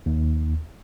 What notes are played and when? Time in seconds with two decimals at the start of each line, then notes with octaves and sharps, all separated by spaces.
0.06 D#2